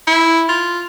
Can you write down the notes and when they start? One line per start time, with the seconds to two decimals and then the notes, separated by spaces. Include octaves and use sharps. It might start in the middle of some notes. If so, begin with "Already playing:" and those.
0.07 E4
0.49 F4